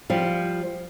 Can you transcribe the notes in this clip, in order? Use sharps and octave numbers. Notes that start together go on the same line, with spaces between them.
F3 G3